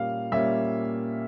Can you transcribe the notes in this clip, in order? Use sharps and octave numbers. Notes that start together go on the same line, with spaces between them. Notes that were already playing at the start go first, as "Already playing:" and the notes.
Already playing: A#2 G3 A#3 C#4 F5
A#2 G3 A#3 C#4 E5